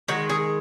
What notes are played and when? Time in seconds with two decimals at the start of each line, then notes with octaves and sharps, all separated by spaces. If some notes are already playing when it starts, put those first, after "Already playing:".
0.08 D#3 G#3 F#4
0.30 G#4